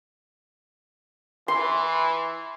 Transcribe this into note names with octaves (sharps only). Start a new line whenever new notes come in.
E3 C6